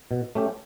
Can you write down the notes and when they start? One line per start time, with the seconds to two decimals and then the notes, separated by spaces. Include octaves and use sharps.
0.11 B2
0.35 A3 C#4 G4